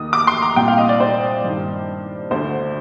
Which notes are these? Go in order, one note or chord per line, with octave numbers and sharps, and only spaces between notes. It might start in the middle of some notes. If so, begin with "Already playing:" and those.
Already playing: D#2 D#3 D#6
D6
C6
A#5
C2 A#2 G5
F5
D#5
D5
C5
G2 D#3
D2 D3 C5